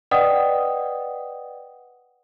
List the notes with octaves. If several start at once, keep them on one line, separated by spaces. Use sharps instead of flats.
B4 D5 D#5 F#5 G5 D#6